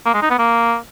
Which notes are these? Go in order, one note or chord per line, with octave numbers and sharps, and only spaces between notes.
A#3
G#3
D#4
B3
A#3